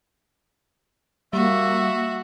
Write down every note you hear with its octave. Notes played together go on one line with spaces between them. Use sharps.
G3 A#3 F#4 E5